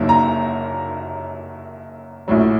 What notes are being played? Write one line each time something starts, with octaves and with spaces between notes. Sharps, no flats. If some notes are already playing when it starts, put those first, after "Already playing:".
Already playing: F#1 F#2 F#3 A#3 D#4
A#5
A#1 A2 F#3